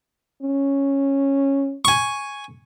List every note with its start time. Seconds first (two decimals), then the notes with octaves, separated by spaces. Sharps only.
0.43 C#4
1.85 G#5 C#6